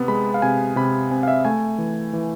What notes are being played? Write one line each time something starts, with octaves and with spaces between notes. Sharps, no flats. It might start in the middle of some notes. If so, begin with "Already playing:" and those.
Already playing: C3 B3
G#3 B5
F5
C3 G#5
C3 B5
C4 G#5
F5
E5
A3 G#5
E3
E3